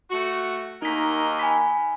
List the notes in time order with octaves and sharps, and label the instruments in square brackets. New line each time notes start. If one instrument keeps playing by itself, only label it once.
[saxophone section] A3 F#4
[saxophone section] D#2 A#4 D#5 [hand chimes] D#4 B6
[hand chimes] G#5 B5 B6